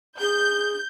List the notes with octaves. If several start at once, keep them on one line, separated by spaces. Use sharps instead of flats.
G#4 G6